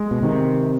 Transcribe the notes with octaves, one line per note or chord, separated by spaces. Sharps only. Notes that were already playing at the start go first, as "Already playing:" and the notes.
Already playing: G#3
B2
C3 D#3